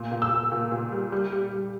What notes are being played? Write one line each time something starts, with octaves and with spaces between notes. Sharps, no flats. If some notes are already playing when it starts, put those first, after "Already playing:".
Already playing: A#2
A#2
E6
A#2
A#2
A#2
G3
G3
G3
G3